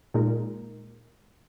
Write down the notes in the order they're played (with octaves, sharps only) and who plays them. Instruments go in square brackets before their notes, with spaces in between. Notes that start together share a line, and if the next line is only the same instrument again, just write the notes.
[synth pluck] A#2 G#3 D#4 A#4